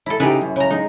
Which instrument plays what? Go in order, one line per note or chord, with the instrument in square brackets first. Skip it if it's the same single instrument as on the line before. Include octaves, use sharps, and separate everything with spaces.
[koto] E4 A4
[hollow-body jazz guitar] C#3 D#4 G4 [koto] E4 B4
[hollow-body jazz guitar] F#2
[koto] C#3 A#5
[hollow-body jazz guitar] G#3 [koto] D#4